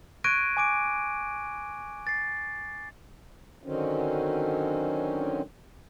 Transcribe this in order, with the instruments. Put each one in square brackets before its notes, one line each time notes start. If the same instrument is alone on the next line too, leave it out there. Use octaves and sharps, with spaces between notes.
[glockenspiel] C#6 F#6 G#6 A#6 D7 D#7
G#5 D6 D7
A6 C7
[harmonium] D3 D#3 F#3 C4 C#4